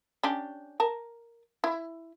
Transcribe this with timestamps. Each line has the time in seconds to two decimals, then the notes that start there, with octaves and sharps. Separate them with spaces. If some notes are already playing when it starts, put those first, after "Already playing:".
0.23 C#4 D4 G4
0.80 A#4 A5
1.64 E4